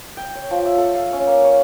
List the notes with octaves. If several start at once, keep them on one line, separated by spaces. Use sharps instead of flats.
G5
C#5
F3
E5
A4
F5
C#4
A#3
C#5